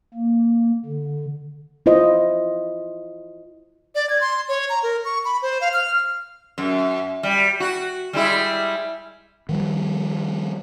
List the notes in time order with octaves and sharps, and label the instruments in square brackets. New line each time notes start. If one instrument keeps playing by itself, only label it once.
[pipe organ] A#3
D3
[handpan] E4 F4 C5 D#5
[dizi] D5
G#6
C6
C#5
A#5
A#4
C#6
B5
C5
F5
F6
[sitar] F#2
G3
F#4
G3 G#3 E4
[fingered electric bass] D#3 F3 G3